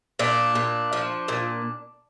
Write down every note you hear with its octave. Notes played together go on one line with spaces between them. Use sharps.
A#2 D4
A#2
F3
A#2